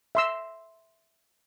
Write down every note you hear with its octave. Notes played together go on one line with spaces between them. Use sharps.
E5 C6 E6